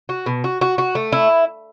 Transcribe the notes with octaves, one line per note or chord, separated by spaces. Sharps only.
F#4
B2
F#4
F#4
F#4
A3
E4